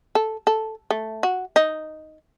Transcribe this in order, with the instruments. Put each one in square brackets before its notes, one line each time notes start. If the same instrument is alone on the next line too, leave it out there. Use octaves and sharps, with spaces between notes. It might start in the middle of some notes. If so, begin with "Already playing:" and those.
[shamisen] A4
A4
A3
F#4
D#4